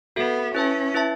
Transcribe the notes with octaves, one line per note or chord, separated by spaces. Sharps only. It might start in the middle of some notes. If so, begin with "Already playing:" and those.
B3 F#4 A4 E5
C#4 E4 B4 E5 A5
E4 B4 E5 A5